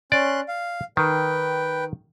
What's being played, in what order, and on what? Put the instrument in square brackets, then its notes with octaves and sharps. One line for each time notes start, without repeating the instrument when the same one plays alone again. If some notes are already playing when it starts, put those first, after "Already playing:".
[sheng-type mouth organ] C#4 C6 F#6 [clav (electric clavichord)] D5
[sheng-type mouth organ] F5
[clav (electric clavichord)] D#3 [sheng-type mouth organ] B4 G5